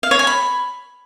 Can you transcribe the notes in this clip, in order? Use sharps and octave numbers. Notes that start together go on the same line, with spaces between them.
F5
C#5
G#5
B5